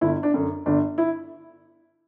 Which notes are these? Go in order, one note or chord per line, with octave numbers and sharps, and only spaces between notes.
G1 E4
D4
F#2 D3
G1 D4
E4